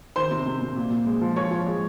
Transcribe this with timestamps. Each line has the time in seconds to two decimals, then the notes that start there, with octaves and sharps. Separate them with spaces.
0.16 D#3 C5 C6
0.31 C3
0.46 C3
0.61 C3
0.76 A#2
0.91 A#2
1.06 G#3
1.21 F3
1.36 F3 C#5 C#6
1.51 F3
1.66 G#3